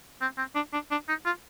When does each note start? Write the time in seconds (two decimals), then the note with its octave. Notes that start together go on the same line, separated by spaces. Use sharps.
0.21 C4
0.38 C4
0.55 D4
0.73 D4
0.91 D4
1.08 D#4
1.25 F4